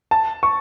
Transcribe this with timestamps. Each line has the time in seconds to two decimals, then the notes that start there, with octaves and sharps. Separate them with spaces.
0.11 A5
0.43 C#6